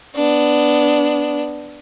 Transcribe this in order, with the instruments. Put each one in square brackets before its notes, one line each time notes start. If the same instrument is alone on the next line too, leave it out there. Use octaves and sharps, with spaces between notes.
[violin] B3 D4